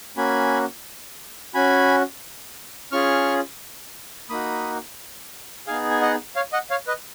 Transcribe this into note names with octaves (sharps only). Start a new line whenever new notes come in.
A#3 C#4 F#4 G#5 B5
C#4 F#4 G#5 B5
C#4 F4 G#4 C#6 F6
A#3 D#4 F#4 B5 D#6
B3 D#4 G#4 F5 G#5
G#5
D#5 F#5
C#5 F5
D#5 F#5
C#5 F5
B4 D#5